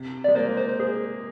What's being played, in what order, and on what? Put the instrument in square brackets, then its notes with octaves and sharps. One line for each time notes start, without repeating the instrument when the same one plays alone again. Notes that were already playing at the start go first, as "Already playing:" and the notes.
Already playing: [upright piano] C3
[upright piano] G#3 [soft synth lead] D5
[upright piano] A#3 [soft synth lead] C5
[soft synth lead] C5
C5
G#4